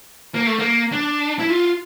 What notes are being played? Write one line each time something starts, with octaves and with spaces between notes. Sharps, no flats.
A#3
A3
A#3
D4
E4
F4